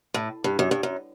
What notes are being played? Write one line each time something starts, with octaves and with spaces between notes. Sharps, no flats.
A2
G2
F#2
G2
F#2